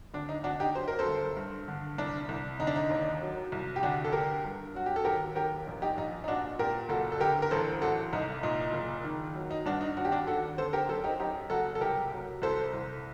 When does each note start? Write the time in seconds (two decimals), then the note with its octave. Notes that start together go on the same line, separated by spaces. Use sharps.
0.14 D2 D4
0.29 D#4
0.44 D2 D4 F#4
0.60 D#4 G4
0.75 F#3 C5
0.88 A#4
0.99 A4 C5
1.06 G1
1.37 G2
1.68 D3
1.98 C2 D4
2.29 C2
2.60 D3 D#4
2.67 D4
2.76 D#4
2.90 D#2
3.21 F#3
3.52 C2
3.76 G4
3.83 D2 D4 F#4
4.04 A4
4.12 D2 G4 A#4
4.44 G2
4.74 F#3 F#4
4.86 G4
4.96 A4
5.05 D#2 G4 A#4
5.36 D#2 G4 A#4
5.67 A#1
5.82 D#4 G4
5.97 A#1 D#4
6.24 D#4
6.28 A#2 D4 F#4
6.59 A#2 G4 A#4
6.89 F#1 F#4 A4
7.12 A4
7.20 D3 G4 A#4
7.42 A#4
7.51 A1 A4 C5
7.81 A1 F#4 A4
8.13 C2 D#4
8.43 A#2 D#4
8.73 F#1
9.04 D#3
9.35 F#3
9.51 D#4
9.65 G2 D4 F#4
9.81 D#4
9.97 D#2 F#4
10.05 G4
10.12 D4 F#4
10.27 D#2 F#4 A4
10.58 D3 A4 C5
10.73 G4 A#4
10.89 F#2 A4 C5
11.04 D#4 G4
11.20 F#2 D#4 G4
11.50 F#1 F#4 A4
11.75 A4
11.81 C2 G4 A#4
12.12 F#3
12.42 C2 A4 C5
12.73 C2